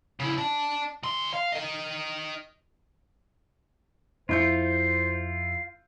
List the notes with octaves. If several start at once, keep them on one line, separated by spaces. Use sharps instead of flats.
C#3 E4
D5 A5
D#3 C6
F5
A#4 D#5
F2 E4 F4 C5 G6 C#7